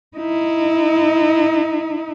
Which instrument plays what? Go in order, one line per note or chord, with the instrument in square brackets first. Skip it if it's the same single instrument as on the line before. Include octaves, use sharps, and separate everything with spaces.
[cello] D#4 E4